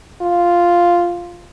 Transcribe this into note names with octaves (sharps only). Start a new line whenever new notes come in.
F4